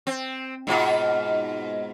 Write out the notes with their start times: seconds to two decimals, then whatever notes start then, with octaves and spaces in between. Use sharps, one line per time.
0.07 C4
0.67 G#2 B2 F4